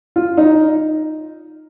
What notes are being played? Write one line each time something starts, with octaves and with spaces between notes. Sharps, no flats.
F4
D#4